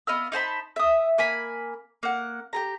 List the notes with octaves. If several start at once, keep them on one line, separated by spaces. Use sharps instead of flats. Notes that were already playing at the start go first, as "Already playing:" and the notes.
B3 D#5 F5 E6
D#4 C5 A5 B5
E5 D#6
A#3 G#5 B5
A#3 F#5
G4 G#4 A#5